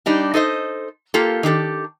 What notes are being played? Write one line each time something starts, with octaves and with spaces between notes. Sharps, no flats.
G3 D4 D#4 G4
D#4 A4 C5 D#5
A#3 F4 G4 A4
D#3 D4 G4 A4